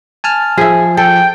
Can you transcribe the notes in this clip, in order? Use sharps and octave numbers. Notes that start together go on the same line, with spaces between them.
G#5 A5 F6
F3 G#4 E5
A4 G5